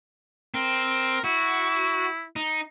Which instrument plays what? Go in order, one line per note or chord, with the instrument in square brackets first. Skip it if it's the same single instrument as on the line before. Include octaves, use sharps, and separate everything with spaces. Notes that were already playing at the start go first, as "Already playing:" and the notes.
[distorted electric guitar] C4 [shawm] A#4
[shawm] E4 [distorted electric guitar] F#4
[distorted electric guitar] D#4